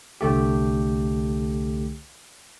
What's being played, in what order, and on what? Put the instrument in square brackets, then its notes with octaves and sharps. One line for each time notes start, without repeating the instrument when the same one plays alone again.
[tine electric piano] C2 D3 A3 G4